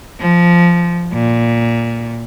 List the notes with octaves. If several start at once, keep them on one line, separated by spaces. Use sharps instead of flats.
F3
A#2